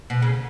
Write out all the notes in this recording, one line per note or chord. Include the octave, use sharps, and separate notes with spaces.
B2
C#3